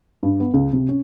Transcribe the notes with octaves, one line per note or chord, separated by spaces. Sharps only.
G2
B3
C#2
C3
C#4